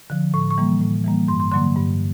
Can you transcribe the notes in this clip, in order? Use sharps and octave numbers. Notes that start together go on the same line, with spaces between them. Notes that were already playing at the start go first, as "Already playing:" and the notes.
D3 F3
A2 C#6
C#6
E3 G3 A#3
A2
E3 G3 A#3
G2 C6
C6
D3 F#3 A#3 C6
G2